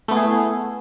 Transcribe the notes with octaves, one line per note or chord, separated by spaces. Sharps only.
A3 B3 E4 G#4